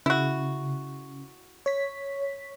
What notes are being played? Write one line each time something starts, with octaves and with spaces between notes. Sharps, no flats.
C#3 E4 F#4
C#5 B6